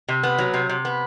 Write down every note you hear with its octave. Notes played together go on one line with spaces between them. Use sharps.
C3
B3
F#3
C3
C3
B3